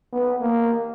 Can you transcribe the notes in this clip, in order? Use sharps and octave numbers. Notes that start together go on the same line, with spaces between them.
B3
A#3